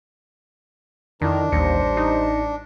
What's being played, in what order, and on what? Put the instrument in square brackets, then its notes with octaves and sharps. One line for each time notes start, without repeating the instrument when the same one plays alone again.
[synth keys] F2 E4 [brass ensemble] D3 A#4 [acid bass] D#3 [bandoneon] D4
[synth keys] A1 A#6 C#7 [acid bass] D#2 [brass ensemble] G3 C5
[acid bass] D#4